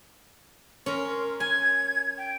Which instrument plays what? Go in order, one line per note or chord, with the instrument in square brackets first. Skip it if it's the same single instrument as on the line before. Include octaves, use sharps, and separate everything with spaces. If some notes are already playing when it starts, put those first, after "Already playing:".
[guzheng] C#4 A#4 [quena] C6
[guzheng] G#5 [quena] G#6
[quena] G5